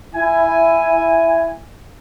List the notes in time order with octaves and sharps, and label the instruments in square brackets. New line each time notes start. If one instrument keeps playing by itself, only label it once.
[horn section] E4 G#5